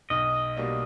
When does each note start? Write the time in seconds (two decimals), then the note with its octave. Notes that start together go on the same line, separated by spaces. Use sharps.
0.10 B1 D#5
0.56 B2 G3 A#3 D4